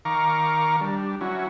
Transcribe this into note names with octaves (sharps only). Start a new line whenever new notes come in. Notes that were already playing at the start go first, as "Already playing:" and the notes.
D#3 A#4 F5 A#5 C#6 D6
G3 D4
F#3 C#4 E4 F#4